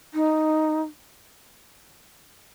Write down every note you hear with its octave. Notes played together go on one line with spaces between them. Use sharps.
D#4